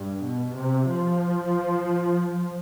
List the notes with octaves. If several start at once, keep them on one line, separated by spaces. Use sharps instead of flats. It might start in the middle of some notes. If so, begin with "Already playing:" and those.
Already playing: G2
B2
C3
F3